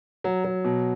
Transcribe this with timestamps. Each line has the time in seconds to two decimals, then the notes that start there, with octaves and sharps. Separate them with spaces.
0.24 F#3
0.44 F#3
0.64 B2